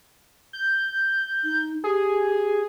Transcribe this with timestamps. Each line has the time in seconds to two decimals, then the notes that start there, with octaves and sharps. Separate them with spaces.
0.53 G6
1.44 D#4
1.84 G4 G#4